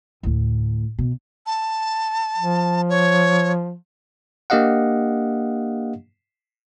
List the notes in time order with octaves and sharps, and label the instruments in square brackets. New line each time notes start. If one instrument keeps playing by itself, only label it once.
[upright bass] D2 A2
B2
[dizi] A5
[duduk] F3
[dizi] C#5
[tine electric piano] A#3 D4 G4 D#5 F5 F#5